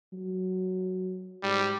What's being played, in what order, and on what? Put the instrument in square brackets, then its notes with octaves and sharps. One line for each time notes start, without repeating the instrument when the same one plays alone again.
[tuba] F#3
[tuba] G#2 [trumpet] G3